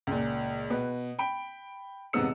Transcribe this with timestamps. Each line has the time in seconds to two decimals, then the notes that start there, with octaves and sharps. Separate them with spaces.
0.07 C#2 A#2
0.70 B2 B4
1.19 G5 B5 D7
2.13 D#1 G#2 C3 B3 E6 C#7